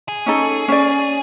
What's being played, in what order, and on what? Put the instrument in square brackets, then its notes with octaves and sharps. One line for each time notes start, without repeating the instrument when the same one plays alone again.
[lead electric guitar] G#4
[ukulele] C#4 D#4 A4
C#4 D5